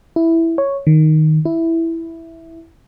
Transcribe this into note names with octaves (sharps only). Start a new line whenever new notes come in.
E4
C#5
D#3
E4